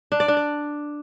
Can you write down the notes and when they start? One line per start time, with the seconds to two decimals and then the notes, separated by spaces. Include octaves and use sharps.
0.12 D4
0.20 D5
0.28 D4
0.37 D5